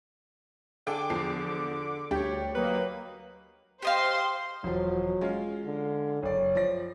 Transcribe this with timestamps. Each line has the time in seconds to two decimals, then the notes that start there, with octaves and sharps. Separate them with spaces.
0.87 D3 G#4 A4 G5 D6
1.10 E2 F3 C7
2.11 D2 G3 D4 G4 C#5 G5
2.55 F#3 A#3 D#4 B4
3.82 G4 C5 D#5 F5 C6
4.64 E1 F3 F#3
5.21 G#3 C#4 F4
5.66 D3
6.23 F#1 C#5 D5
6.55 F3 D5 A#6